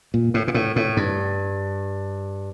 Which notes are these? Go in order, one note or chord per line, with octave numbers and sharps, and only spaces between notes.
A#2
A2
A#2
A2
A2
G2